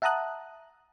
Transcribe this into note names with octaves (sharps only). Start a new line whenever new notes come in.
E5 F#5 A5 A#5 D#6 F#6